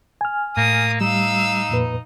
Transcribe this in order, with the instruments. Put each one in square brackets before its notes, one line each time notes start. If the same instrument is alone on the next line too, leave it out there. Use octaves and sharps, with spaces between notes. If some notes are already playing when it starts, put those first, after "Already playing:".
[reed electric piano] G#5 F6
[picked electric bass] A2 [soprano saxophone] A#3 [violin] D#6
[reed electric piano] G3 [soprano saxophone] D#4 [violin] F5 E6
[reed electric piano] F2 A#2 B4